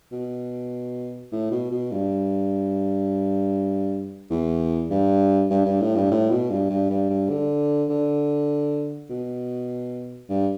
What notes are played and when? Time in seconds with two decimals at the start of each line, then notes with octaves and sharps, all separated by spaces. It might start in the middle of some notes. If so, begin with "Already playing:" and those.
0.12 B2
1.32 A2
1.51 B2
1.71 B2
1.92 G2
4.30 E2
4.90 G2
5.50 G2
5.65 G2
5.80 A2
5.95 G2
6.11 A2
6.31 B2
6.50 G2
6.70 G2
6.90 G2
7.10 G2
7.30 D3
7.89 D3
9.10 B2
10.29 G2